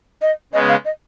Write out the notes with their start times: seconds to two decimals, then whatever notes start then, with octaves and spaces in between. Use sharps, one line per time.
0.22 D#5
0.53 C#3 G#3 B3 D#5
0.69 F5
0.85 D#5